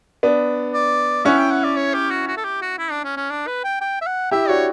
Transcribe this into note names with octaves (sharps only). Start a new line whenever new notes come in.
B3 D4
D5
C#4 E4 F#5
G5
F#5
D5
C#5
G4
F#4
F#4
A4
G4
F#4
E4
D4
C#4
C#4
D4
B4
G5
G5
E5
F#5
E4 G4 E5
D4 F#4 C#5